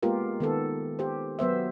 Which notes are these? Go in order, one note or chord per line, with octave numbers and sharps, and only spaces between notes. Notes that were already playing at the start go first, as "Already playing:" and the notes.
G#3 A#3 B3 F4 G4 A#4
D#3 B3 A4
G4 C5
F#3 B3 C5 E5